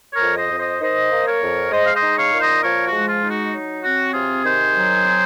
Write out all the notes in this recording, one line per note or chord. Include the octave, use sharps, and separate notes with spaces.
A#4 C#5
F2
C5 D#5
F2
C5 D#5
D#3 C5 D#5
A#3
A#4 C#5
F2
G#3 C5 D#5
F5
C5 D#5
D#4
C#5 F5
A#2
C5 D#5
F3 A#4 C#5
F#4
G#3
F4
D#4
F#4
F#3
C4 F#4
C3 F4 G#4
D#3 G#4 C5
F#3
C4